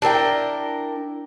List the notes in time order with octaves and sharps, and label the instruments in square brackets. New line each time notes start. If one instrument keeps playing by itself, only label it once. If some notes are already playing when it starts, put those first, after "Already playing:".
[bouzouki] D4 E4 A#4 G5